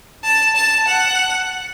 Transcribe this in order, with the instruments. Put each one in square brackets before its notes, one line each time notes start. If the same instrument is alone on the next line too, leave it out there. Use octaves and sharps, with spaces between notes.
[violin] A5
A5
F#5